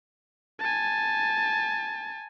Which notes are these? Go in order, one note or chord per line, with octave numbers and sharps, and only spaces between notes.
G#5 A5